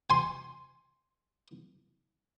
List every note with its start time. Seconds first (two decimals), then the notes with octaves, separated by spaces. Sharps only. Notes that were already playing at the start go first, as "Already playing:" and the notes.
0.10 G#5 C6